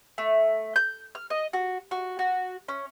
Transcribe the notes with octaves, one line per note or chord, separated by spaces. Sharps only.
A3
G6
F6
D#5
F#4
F#4
F#4
C#4